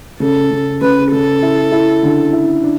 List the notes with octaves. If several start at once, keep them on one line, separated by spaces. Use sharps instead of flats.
C#3 A4
C#3
C#3 B4
C#3 A4
E4
E4
D3
E4
D4